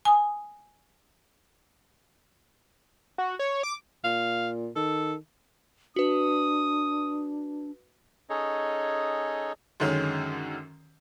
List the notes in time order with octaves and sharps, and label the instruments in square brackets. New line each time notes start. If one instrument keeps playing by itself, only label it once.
[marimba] G#5 D#6
[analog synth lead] F#4
C#5
D6
[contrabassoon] A#2 [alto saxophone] F5
[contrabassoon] D#3 [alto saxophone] A4
[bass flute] D4 [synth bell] F#4 B4 [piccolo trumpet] D#6
[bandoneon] C#4 D#4 G#4 A4 C#5 D#5
[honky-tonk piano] F#2 D3 D#3 G#3 C#4